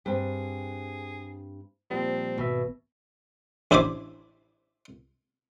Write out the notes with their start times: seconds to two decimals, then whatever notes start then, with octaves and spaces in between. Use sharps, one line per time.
0.06 G2 C4 G#4
1.91 A#2 F3 G3 C4
2.38 G#1 B2 E5
3.71 A1 D4 E4 C5 B5 D6